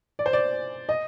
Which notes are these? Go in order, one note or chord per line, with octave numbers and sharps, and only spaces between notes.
D5
C5
D5
D#5